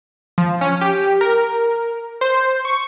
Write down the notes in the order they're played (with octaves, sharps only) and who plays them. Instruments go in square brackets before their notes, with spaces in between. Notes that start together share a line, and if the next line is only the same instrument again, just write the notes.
[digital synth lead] F3
C#4
G4
A#4
C5
C#6